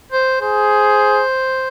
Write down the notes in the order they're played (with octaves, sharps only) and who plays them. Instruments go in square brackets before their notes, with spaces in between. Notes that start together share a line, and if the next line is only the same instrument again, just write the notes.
[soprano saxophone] C5
[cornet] G#4 [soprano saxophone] C5